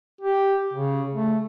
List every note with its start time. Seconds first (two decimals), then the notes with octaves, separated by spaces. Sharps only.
0.21 G4
0.73 C#3
1.14 A3